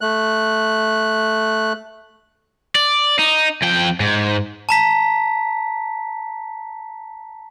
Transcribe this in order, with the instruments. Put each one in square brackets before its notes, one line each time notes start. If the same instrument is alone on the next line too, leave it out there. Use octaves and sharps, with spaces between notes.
[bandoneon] A3 F#6
[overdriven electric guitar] D5
D#4
F2 G5
G#2
[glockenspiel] A5 A#5 B6